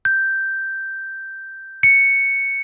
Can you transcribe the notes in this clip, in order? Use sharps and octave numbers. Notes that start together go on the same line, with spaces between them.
G6
C#7